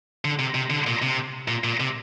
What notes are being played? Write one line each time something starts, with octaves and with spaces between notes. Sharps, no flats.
D3
C3
C3
D3
A#2
C3
A#2
A#2
C3